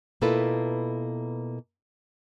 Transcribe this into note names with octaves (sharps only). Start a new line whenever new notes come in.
B2 A#3 E4 F4 A4 B4